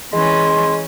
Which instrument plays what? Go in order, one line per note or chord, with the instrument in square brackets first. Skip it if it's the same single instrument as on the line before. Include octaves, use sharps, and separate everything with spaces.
[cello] E3 C#4 [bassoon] G#3 [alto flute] C6